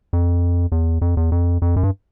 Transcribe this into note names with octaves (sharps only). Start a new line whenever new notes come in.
F2
E2
F2
E2
F2
F2
F#2
G2